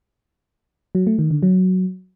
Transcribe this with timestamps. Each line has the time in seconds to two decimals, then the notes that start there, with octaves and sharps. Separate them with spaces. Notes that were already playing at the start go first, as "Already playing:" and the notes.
0.95 F#3
1.07 A3
1.19 D#3
1.31 D3
1.43 F#3